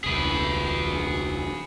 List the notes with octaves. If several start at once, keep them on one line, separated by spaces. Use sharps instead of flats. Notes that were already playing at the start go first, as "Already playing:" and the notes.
E1 C#2 G#4 B4